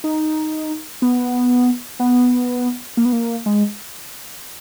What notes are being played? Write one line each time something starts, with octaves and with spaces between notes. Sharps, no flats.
D#4
B3
B3
A#3
B3
A#3
G#3